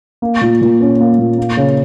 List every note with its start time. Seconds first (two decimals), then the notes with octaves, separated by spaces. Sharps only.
0.22 A#3
0.41 A#2
0.61 A#2
0.81 C#4
1.00 A#3
1.19 A#2
1.38 A#3
1.57 C#3